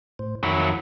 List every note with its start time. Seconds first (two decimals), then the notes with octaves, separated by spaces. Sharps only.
0.19 A2 C5
0.43 F2 D#3 F#3 E4